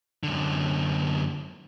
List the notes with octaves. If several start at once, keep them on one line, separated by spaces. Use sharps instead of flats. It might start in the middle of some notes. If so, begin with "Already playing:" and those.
F#2 D3